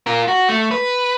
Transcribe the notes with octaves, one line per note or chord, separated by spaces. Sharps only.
F4 A#4
F#4
A3
B4